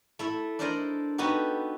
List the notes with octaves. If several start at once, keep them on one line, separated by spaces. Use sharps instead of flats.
A3 E4 E5
D4 A4 A#4 C5 D5 D#5
B3 D#4 F#4 G4 A4